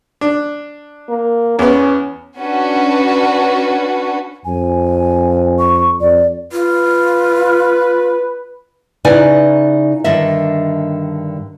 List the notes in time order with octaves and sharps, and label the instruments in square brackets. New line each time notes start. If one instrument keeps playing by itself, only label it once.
[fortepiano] D4
[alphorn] A#3
[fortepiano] E2 B3 [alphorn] C#4
[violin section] C#4 D4 F#4 B4
[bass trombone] F2 [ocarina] G#5
[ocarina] C#6
[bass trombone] F2 [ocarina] D5
[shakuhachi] F4 [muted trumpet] B4
[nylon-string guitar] C#3 D#4 E4 B4 D5 G#5
G2 D3 D#3 D#5 E5